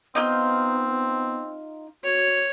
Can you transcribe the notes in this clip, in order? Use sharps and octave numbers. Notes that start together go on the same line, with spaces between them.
B3 C4 D#4 F4 G6
F#4 C#5